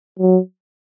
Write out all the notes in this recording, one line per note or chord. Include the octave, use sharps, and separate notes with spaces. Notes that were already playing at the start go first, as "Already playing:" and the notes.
F#3